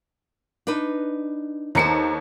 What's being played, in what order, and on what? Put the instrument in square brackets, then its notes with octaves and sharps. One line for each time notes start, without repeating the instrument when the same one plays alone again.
[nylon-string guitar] D4 D#4 B4
[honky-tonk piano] D#2 A#5 C#7 [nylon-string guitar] D#4 A4 C5